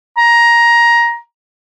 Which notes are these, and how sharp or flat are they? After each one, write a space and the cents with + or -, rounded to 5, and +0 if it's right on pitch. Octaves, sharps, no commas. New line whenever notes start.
A#5 +15